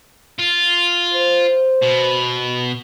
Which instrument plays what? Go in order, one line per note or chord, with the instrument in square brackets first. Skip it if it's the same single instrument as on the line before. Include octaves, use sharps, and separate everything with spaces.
[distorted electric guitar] F4
[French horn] C5
[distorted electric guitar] B2